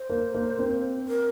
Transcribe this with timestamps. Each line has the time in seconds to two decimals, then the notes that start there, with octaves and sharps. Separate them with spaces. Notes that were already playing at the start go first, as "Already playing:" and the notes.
Already playing: C5
0.10 A#3
0.35 A#3
0.59 C4
1.08 A#4